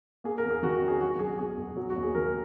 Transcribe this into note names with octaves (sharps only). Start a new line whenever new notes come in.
A#3 G#4
A#4
E2
G#4
D#3 F#4
F#4
C#4
G#4
F#3 F#4
B1 G#4
B2 G#4
B1
F#3
F#4
D#2
G#4
D#3 A#4